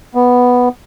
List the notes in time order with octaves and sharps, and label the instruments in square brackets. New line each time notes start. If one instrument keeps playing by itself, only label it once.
[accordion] B3